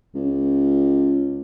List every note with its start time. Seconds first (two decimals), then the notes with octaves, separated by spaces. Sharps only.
0.15 C#2